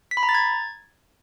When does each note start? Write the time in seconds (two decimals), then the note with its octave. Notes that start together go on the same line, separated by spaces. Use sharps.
0.11 B6
0.17 B5
0.23 A#5
0.29 A6
0.35 G#6